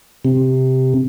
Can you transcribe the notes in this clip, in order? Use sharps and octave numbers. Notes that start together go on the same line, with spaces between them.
C3